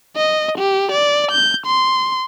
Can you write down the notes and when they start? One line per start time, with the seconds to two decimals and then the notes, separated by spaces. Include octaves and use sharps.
0.17 D#5
0.58 G4
0.92 D5
1.32 G6
1.67 C6